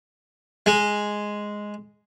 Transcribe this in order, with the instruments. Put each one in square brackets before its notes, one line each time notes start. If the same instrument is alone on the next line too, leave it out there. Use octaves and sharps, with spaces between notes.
[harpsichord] G#3